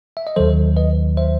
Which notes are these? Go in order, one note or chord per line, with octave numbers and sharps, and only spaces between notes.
E5
D#5
D#2 D#3 F#3 A4 C5
B4 D#5
C5 E5